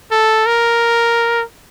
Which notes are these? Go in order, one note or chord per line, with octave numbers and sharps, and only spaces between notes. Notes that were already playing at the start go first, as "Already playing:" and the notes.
A4
A#4